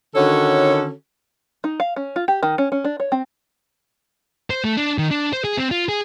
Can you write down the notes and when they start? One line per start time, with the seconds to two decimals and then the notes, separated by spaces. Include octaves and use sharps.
0.15 D3 D#3 C#4 F#4 A4 C#5
1.64 D#4
1.80 F5
1.96 C#4
2.16 F4
2.28 G4
2.43 D#3
2.58 C#4
2.72 C#4
2.85 D4
3.00 C#5
3.12 C4
4.50 C5
4.64 A3
4.77 D4
4.98 D#3
5.11 D4
5.33 C5
5.44 G#4
5.57 C4
5.71 F4
5.89 G#4